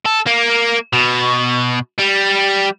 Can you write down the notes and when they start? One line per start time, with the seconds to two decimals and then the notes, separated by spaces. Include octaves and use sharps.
0.06 A4
0.27 A#3
0.93 B2
1.99 G3